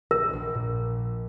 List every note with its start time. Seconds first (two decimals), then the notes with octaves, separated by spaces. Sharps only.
0.11 A#1 A#4
0.33 A#1
0.55 A#2